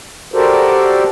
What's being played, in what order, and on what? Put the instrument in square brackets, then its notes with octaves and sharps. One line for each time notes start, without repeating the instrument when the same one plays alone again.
[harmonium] F#4 G4 A4 A#4 C5 D5